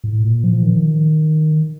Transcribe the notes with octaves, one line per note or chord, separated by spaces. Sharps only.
A2
A#2
F3
D#3